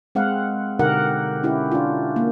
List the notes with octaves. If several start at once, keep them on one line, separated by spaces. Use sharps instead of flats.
G#3 C4 F5 F#5
B2 D3 D#4 G4 A#4 F#5
C#4 E4 G4
D4 F4
A#3